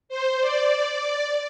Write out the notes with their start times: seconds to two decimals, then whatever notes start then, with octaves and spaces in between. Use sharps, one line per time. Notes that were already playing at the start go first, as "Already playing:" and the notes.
0.09 C5
0.40 D5